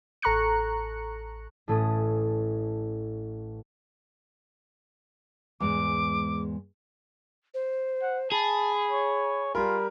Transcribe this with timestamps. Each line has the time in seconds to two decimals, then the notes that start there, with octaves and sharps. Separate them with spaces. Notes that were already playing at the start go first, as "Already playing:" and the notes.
0.22 A1 A4 A#5 C#6 F#6 C#7
1.68 A1 A2 A3 C#4 A5 D#6
5.60 E2 G#2 G#3 D6
7.54 C5
8.02 F#5
8.32 G#4 A5 B5
8.91 C#5
9.55 G3 F4 A#4 B5